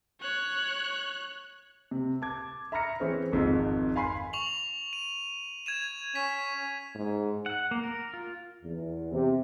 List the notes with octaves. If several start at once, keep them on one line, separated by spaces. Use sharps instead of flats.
C#5 F#6
C3
A5 D6 G#6
E5 A#5 B5 F6 A#6 C#7
E3 C4 C#4 G#4 C5
G#1 F2 G#2 D#4 F4
F5 G#5 B5 C6 C7
C#6 F7 F#7
D#7
G#6 D#7 E7
C#4 B6 D#7
G#2
F#5
A#3
A#4
F4
E2
C3